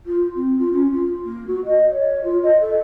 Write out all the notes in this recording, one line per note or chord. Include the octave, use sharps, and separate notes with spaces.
F4
C4
F4
C#4
F4
A#3
F#4
D#5
C#5
F4
D#5
A4